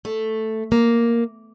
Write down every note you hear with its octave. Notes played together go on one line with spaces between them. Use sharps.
A3
A#3